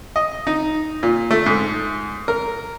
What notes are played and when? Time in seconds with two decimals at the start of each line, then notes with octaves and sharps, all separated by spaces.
0.16 D#5
0.47 D#4
1.03 A#2
1.31 A3
1.46 G#2
2.28 A#4